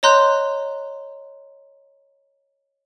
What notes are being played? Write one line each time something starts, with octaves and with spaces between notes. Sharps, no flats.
C#5 D#5 A#5 C6 F#6 G6